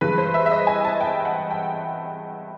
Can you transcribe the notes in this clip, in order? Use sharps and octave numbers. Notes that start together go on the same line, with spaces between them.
G2 E3 G#3 B4
C5
E5
E5
D#5
G#5
A5
G5
F#5
G5